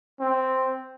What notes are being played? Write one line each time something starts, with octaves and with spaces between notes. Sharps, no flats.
C4